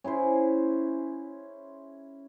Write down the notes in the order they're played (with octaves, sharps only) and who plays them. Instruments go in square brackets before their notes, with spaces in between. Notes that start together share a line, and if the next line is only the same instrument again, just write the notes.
[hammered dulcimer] C#4 E4 G#4 C5